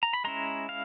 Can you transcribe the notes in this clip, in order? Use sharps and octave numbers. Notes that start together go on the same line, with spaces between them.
A#5
B5
G#3 C#4 E4 A#5 C6
F5